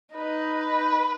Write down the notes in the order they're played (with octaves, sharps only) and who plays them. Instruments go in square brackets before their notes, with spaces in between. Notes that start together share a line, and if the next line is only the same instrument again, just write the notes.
[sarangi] D#4 [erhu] B4